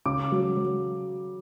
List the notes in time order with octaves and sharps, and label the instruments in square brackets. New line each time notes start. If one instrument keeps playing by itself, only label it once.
[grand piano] C#3 D6
F#3
F#3